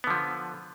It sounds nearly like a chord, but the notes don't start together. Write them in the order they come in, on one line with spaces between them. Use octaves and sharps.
B3 D3 F3